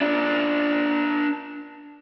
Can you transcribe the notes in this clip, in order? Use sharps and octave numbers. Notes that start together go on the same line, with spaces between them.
D4 F4